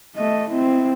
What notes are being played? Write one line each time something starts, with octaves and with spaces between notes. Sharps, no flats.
A3 D#5
C4 E4